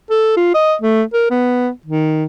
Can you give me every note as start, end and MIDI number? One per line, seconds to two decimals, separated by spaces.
0.11 0.35 69
0.37 0.51 65
0.54 0.74 75
0.82 1.02 57
1.14 1.26 70
1.30 1.69 59
1.86 2.26 51